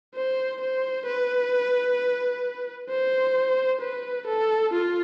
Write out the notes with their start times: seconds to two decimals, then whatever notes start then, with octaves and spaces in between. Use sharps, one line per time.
0.15 C5
0.61 C5
1.06 B4
2.90 C5
3.81 B4
4.27 A4
4.73 F4